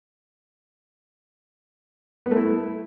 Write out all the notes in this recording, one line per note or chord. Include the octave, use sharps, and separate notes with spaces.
B3
A3
E4